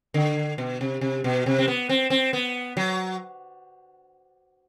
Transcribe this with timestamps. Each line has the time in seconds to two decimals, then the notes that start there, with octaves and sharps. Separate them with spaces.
0.14 D3
0.58 B2
0.81 C3
1.01 C3
1.24 B2
1.46 C3
1.59 C4
1.68 B3
1.89 C4
2.10 C4
2.33 B3
2.77 F#3